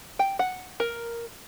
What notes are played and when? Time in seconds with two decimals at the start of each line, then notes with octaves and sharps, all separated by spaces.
0.19 G5
0.39 F#5
0.80 A#4